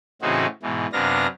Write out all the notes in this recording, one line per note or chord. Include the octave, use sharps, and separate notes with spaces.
A2 C#3 E3 C4 D#4 F#4
G#2 B2 E3
F#2 C3 B3 D4 F5 A#6